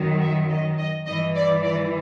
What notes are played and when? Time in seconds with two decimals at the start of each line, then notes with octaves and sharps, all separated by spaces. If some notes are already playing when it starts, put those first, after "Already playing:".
Already playing: F#2 D#3 F#3
0.21 E5
0.50 D#5
0.78 D#5
1.06 G2 E3 D#5
1.35 D5
1.63 D5